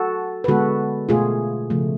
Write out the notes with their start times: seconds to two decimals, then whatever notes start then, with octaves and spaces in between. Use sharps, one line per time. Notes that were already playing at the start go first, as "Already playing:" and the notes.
Already playing: F#4 A4
0.44 B4
0.48 D3 G#3 B3 F#4 A4
1.09 B2 A3 F4 G#4
1.70 C#3 F3 A3